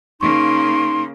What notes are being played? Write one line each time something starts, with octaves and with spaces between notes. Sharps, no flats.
C#3 A#3 D#4 C6 C#6